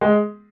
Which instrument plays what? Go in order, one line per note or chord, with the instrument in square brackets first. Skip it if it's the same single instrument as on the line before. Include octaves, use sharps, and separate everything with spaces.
[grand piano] G#3